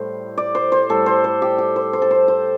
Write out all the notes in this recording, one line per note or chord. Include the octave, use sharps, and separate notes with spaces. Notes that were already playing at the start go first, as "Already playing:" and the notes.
Already playing: A2 G3 C5
D5
C5
C5
A2 G3 A4
C5
C5
G4
G4
C5
C5
A4
C5
C5